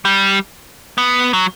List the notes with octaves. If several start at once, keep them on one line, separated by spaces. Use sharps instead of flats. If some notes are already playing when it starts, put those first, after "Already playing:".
G3
B3
F#3